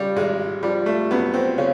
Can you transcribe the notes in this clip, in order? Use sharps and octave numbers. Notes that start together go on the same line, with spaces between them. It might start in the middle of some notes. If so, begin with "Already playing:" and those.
Already playing: C#3 G3
G#1 G#3
F3 G3
A3
F#2 B3
C4
C#3 C#4